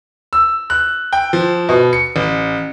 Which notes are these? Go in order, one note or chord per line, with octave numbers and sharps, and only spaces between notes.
E6
F#6
G5
F3
B2
C#7
A1